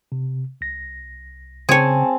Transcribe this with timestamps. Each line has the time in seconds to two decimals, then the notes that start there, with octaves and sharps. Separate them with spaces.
0.12 C3
0.61 C2 A#6
1.69 C#3 C4 G#4 C#5 G#5 A5